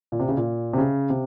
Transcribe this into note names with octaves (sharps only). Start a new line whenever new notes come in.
A#2
C3
C#3
A#2
C3
C#3
C3